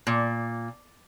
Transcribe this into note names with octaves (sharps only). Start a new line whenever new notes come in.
A#2